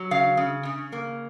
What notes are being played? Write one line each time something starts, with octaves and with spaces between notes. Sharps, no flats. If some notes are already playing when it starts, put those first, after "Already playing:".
Already playing: F#3
C#3 F5
C#3
C#3
A#3